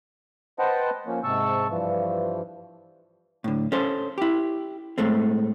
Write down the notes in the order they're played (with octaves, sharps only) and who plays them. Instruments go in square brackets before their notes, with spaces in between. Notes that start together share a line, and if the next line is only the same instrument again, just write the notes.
[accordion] B4 C5 D#5 F#5 G5 A5
F3 A#3 C#4
G#2 C3 A5 C#6 E6
G2 E3 F3
[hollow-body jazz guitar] A2 D3
C#4 A4 C5
E4 G4
A2 G#3 A3 C4